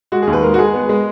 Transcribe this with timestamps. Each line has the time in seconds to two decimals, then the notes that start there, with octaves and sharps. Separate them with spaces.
0.12 G#3 F#4
0.22 D#2 G#4
0.33 B4
0.43 G#3 A#4
0.54 F#4
0.58 G#3 G#4
0.74 B3
0.89 G#3